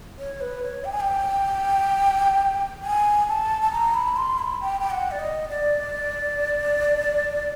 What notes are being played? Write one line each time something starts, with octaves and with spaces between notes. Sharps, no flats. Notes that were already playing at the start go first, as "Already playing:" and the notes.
C#5
B4
C#5
G5
G#5
G5
G#5
A5
A5
A#5
B5
C6
B5
G5
G5
F#5
D5
D#5
D5